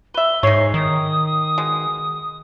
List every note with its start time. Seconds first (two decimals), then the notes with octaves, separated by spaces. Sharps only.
0.14 B4 E5 G7
0.43 G#2 D#4 C#5 C7
0.74 D#3 D#6
1.58 B2 G#3